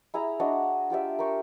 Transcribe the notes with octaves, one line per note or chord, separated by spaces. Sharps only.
E4 G#4 E5 A#5
D4 F#4 D#5 C6
F4 G4 D5 E5
A#4 G5 C6 C#6